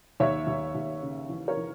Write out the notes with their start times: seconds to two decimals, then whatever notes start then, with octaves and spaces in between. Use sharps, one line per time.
0.20 D#2 C#5 E5
0.47 D#2
0.75 D#2
1.02 C#3
1.29 E3
1.48 A#4 C#5
1.57 E3